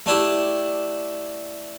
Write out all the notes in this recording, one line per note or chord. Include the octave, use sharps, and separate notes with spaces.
A3 D4 E4 G4